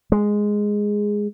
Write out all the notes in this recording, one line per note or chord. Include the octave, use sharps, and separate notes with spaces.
G#3